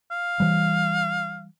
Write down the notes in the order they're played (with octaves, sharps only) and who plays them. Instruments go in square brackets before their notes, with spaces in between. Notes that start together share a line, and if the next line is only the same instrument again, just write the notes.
[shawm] F5
[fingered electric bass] E3 G3